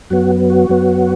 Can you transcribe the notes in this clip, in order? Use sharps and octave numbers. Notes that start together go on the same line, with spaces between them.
F#2 F#3 B3 F#4
F#4
F#2 F#3 B3